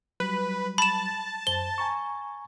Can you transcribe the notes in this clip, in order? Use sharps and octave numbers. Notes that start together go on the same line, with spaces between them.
F#3 G3 B4
A5 B5 E7
F#2 C5 G7
G#5 A#5 C#6